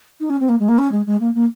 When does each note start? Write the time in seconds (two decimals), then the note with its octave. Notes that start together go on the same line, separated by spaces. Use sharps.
0.20 D#4
0.30 C#4
0.40 C4
0.49 A#3
0.59 G#3
0.68 A#3
0.78 C#4
0.91 G#3
1.06 G#3
1.20 A#3
1.34 A#3